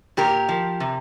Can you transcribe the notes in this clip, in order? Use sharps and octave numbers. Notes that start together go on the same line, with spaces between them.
A#2 G4 A#4
F3
C3